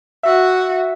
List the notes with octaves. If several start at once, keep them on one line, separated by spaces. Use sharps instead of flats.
F#4 E5